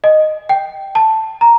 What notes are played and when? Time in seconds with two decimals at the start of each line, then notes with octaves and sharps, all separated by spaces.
0.04 D#5
0.49 G5
0.95 A5
1.41 A#5